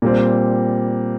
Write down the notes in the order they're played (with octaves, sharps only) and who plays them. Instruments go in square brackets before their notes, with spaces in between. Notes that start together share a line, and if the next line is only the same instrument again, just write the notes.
[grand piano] A#2 G3 C4